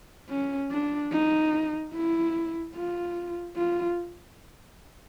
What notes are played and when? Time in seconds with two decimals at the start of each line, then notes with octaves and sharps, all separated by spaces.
0.29 C#4
0.71 D4
1.12 D#4
1.93 E4
2.75 F4
3.56 F4